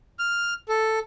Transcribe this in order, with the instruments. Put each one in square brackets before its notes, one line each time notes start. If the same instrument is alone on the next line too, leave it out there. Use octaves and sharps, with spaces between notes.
[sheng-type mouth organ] F6
A4